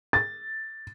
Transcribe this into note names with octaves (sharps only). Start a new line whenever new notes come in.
A6